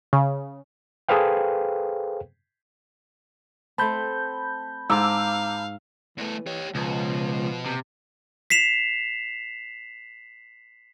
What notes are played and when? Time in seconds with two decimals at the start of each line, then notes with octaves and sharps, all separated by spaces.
0.13 C#3
1.09 G#4 A4 B4 C5 F5 G5
3.78 A3 C4 A5 B5 G6
4.90 G#2 F5 A#5 D6 E6
6.18 E2 E3 A3
6.47 G4 C#5
6.75 C#2 B2 F3
7.66 C3
8.50 B6 C7 E7 F7